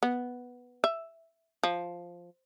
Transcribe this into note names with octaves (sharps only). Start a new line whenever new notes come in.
B3
E5
F3